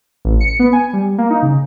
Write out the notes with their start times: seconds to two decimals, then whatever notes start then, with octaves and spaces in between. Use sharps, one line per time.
0.25 A1
0.40 C#7
0.59 B3
0.73 G#5
0.93 G3
1.18 A#3
1.30 D#4
1.42 C#3